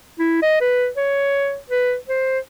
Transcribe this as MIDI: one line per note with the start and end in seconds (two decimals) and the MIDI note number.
0.19 0.41 64
0.42 0.59 75
0.61 0.88 71
0.97 1.57 73
1.70 1.96 71
2.08 2.39 72